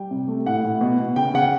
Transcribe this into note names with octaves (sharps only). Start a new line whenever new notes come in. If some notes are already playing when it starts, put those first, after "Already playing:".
Already playing: G3 G5
C3
A3
A2 F#5
A2
B2
B2
C#3 G5
C#3 F#5